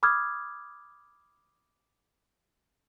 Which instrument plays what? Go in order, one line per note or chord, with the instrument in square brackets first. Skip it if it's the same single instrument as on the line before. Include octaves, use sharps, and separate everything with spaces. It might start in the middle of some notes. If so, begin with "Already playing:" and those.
[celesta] B5 D6 D#6 F6 G#6